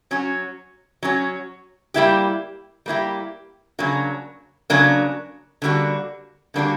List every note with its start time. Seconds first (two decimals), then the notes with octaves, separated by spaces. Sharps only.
0.11 F#3 C#4 F#4
1.03 F#3 C#4 F#4
1.94 G3 A#3 E4 G4
2.86 G3 A#3 E4 G4
3.79 C#3 F#3 A#3 D4 F#4
4.70 C#3 F#3 A#3 D4 F#4
5.62 D3 G3 A#3 D4 F#4
6.54 D3 G3 A#3 D4 F#4